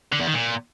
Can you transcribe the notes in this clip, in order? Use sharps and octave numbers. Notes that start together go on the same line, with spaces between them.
D3
E2
D#3
A#2